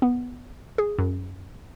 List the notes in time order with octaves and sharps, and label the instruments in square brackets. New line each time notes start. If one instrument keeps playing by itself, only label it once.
[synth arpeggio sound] B3
G#4
F#2